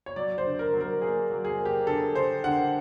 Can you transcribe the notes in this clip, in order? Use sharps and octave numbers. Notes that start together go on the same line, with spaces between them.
C#5
F#3 D5
C5
D3
A#4
F#3
A#4
A#3 G#4
F#3
G#4
A#3
G4
D3 A4
D3 C5
D3 F#5